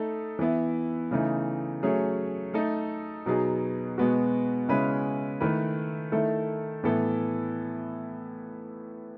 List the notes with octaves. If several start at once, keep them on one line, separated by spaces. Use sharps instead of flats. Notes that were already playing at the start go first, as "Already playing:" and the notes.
Already playing: A3 D#4 A4
E3 B3 E4
C#3 E3 A3 D#4
F#3 A3 C#4 G#4
A3 D#4 A4
B2 F#3 B3 D#4 G#4
B2 G#3 B3 F#4
C#3 G#3 C#4 E4 B4
D#3 A3 E4 B4
D#3 A3 E4 A4
A2 E3 B3 E4 A4